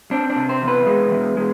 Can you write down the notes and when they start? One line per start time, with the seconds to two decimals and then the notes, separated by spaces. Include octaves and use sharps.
0.11 C4 D4
0.30 D4
0.36 C3
0.49 C5
0.62 E2
0.68 B4
0.87 G#3
1.11 E2
1.37 G#3